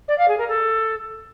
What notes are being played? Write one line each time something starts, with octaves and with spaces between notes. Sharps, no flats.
D5
F5
G#4
A#4
A4